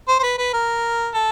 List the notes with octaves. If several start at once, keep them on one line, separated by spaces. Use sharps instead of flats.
C5
C5
B4
B4
A#4
A4